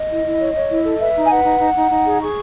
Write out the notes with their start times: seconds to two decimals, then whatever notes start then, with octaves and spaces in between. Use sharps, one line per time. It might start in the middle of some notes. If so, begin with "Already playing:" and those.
Already playing: D#5
0.09 E4
0.24 E4
0.39 C#5
0.55 C#5
0.69 E4
0.84 A4
1.00 B4 E5
1.15 D#4
1.24 G#5
1.30 B4 F#5
1.44 D#4
1.60 D#4
1.75 D#4
1.91 D#4
2.05 G#4
2.20 G#4 C#6